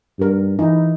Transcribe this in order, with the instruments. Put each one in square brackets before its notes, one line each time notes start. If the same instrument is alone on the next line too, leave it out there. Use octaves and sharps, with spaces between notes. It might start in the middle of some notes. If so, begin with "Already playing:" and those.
[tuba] G2 [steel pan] G4 A#4
[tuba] E3 [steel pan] D#4 E4